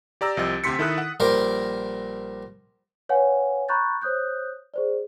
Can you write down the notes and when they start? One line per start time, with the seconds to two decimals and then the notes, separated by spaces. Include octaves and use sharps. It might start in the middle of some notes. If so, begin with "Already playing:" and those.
0.21 G4 D5 A#5 E6
0.37 C2 F3 G4 D#5 A6
0.64 D2 C3 G4 C6 B6 C#7
0.79 D#3 E4 A4 D#6 F#6
0.98 F#5
1.20 A#1 G3 A#4 C5
3.09 B4 C#5 F5 F#5 G#5
3.69 A#5 B5 C#6 F#6 G6 A6
4.02 C5 C#5 D#6 F#6 G6
4.74 G#4 C5 D5